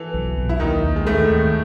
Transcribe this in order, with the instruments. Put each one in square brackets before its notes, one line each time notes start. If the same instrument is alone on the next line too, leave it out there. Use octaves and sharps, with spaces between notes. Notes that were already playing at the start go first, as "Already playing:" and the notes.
Already playing: [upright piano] E3 A4
[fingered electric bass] B1
B1
[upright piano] E4
[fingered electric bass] D#2 [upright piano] D#3 D#4
[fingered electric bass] D#2
[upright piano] G#3
[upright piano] A2 A3 [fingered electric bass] D#3
[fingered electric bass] D#2